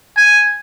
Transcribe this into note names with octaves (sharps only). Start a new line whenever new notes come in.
G#5